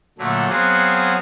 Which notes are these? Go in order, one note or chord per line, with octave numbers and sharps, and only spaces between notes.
A#2 D3 F#3 A3
F#3 B3 C4 G#4 F5 F#5